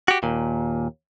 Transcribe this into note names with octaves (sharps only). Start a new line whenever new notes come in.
F#4 G4
D#2 A#2